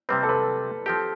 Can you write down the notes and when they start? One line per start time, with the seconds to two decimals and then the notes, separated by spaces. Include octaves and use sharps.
0.09 C3 G3 C4 B4
0.23 A4
0.29 B4
0.86 F3 C4 G4 A4